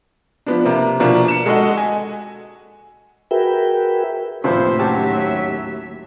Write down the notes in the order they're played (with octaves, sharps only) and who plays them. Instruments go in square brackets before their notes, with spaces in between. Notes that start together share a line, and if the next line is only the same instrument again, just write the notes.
[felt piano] F3 B3 D4
C3 A#3
B2 D3 F3 A#3 B3 D4
C#7 E7
G#3 F#4 A4 D#5 F#5
G#5
[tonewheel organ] F#4 G#4 A#4 B4 E5 G5
[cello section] D#2 A2 E5 [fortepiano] C3 F3 B4 [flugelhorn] C5
[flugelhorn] F#3 [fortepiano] C#4 G4 A5